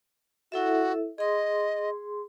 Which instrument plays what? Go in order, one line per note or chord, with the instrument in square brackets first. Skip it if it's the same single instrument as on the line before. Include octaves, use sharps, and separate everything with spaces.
[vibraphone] E4 A4 E5 [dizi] F#4
[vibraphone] G#4 C6 [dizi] D#5